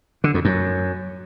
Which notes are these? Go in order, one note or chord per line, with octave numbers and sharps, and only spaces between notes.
D3
F2
F#2